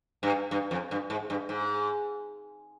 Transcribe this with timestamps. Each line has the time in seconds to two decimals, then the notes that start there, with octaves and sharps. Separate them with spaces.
0.23 G2
0.51 G2
0.71 F2
0.91 G2
1.10 G#2
1.30 G2
1.49 G#2